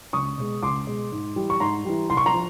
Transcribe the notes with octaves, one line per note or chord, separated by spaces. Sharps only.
C#2 C#6 D#6
B2 G#3
C#2 C6 D6
B2 G#3
G#2
E3 G3
C#6
G#2 A#5 C6
E3 G3
C2 C6
C#6
A#5 C6
F3